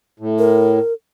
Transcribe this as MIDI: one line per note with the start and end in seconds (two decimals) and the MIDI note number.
0.20 0.79 45
0.39 0.93 70